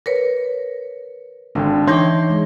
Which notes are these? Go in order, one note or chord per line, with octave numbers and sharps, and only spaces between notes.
A#4 B4 C#5
G#1 D3 D4 G5
E3 D#4 C#5 G5 C6 D6 G6 A#6
G#3